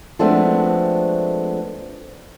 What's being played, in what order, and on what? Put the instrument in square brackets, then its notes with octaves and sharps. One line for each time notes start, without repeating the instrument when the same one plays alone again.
[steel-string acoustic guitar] F3 G#3 A3 B3 C4 D4